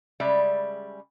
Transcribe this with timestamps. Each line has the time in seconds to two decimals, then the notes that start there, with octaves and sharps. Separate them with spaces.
0.20 C#3 G3 G#3 D5 E5